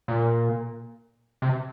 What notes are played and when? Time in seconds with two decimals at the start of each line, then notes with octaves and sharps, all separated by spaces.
0.08 A#2
1.42 C3